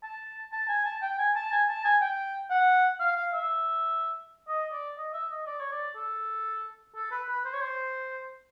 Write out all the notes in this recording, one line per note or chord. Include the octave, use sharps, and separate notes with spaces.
A5
A5
G#5
A5
G5
G#5
A5
G#5
A5
G#5
G5
F#5
F5
F5
E5
D#5
D5
D#5
E5
D#5
D5
C#5
D5
A4
A4
B4
B4
C5
C#5
C5